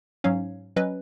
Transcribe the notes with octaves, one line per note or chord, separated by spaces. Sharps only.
G#2 F#3 C#4 C#5 F5
F#3 C#4 B4 D#5